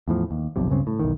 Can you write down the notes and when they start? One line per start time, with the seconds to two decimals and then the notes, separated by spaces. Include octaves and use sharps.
0.08 E2 A2 F3
0.31 D#2
0.56 F#1 B1 F2 C3
0.69 C#2 G2 C#3 C4
0.87 A2
1.00 B1 E2 D#3